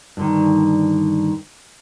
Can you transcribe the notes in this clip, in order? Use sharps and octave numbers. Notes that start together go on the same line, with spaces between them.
G2 D3 D#3